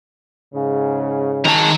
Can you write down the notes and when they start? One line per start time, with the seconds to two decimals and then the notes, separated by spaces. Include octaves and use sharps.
0.53 G#2 C#3
1.45 D#3 F#4 G#4 A5 A#5